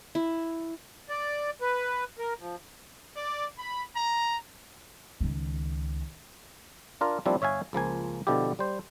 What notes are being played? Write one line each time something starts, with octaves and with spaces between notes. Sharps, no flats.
E4
D5
B4
A#4
F3
D5
B5
A#5
C#2 D#3
D4 F4 A#4
F3 G3 A#3 C4 D4 E4
G1 C#5 E5 F5 G#5
C#2 F3 A#3 G#5
B2 D3 F3 E4 G4
G3 C5